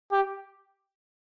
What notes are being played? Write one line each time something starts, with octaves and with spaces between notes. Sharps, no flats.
G4